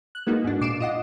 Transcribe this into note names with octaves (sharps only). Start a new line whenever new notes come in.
F#6
G#3 A#3 B3 D#4 F#4
G#2 D4
A#2 D6 C7 D7 E7
F4 D#5 F#5